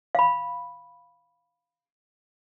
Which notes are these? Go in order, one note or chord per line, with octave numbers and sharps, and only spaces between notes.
F5 B5